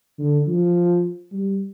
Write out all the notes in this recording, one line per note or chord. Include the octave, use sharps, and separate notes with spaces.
D3
F3
G3